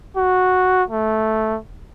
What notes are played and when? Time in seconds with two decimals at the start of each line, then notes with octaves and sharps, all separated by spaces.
0.16 F#4
0.90 A3